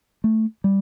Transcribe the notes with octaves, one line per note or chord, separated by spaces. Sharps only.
A3
G3